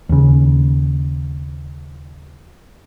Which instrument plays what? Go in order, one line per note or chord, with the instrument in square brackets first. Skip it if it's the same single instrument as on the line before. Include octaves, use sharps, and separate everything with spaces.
[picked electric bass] D#2 C#3